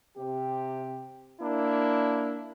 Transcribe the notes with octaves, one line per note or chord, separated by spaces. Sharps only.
C3 G4
A#3 D4 E4